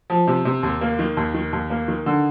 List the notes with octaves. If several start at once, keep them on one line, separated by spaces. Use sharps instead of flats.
F3
C3
C3
D#2
A#3
D#3
D#2
D#3
D#2
A#3
D#3
D3